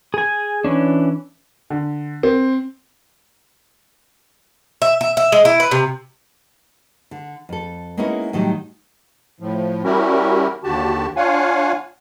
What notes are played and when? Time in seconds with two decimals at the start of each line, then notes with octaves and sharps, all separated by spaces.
0.14 G#4 G#5
0.64 E3 C#4 D4
1.70 D3
2.23 C4
4.82 E5
5.01 E5
5.17 E5
5.32 G#3
5.45 E4
5.60 B4
5.71 C3
7.11 D3
7.49 F2 A4
7.97 G#3 A#3 B3 C#4 D#4 E4
8.33 A2 D#3 F#3 G3
9.40 A2 F3
9.84 G3 C#4 E4 F#4 G4 A#4
10.64 D#2 D3 F#4 G4 A5
11.16 D4 F4 C#5 F5 F#5 G#5